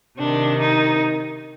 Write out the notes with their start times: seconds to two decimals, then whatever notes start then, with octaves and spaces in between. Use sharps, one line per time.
0.18 C3 D#3 D4
0.60 D#4